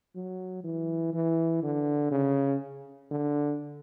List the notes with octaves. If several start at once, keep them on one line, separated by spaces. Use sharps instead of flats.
F#3
E3
E3
D3
C#3
D3